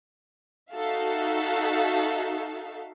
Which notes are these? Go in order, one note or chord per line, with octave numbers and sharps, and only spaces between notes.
D#4 F#4 A4 E5 F5